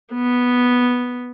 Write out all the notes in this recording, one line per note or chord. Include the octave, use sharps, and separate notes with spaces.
B3